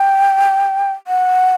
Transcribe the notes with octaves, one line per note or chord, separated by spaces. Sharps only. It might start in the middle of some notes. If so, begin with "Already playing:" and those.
Already playing: G5
F#5